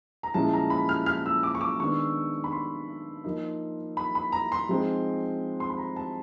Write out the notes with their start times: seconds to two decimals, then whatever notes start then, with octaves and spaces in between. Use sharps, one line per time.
0.23 A#5
0.34 A#2 F3 G#3 C#4 E4 A5
0.53 A#5
0.70 B5
0.89 F6
1.06 F6
1.26 E6
1.43 D6
1.55 C#6
1.61 D6
1.80 D#3 G#3 B3 D4 C#6
2.44 B5
2.52 C6
3.24 F3 A#3 D#4
3.97 B5
4.15 B5
4.32 A#5
4.52 C6
4.69 F3 G#3 C4 D#4
5.60 C6
5.70 B5
5.78 A#5
5.96 A5